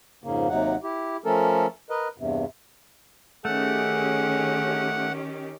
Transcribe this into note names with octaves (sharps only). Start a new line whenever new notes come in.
F2 G#2 C#3 A#3
D#2 C3 F#3 D#4 F#5
E4 G4
F3 A3 C#4 A4 A#4
A#4 B4 D#5
E2 G2 C3
D#3 A3 C#4 G4 G#4 F#5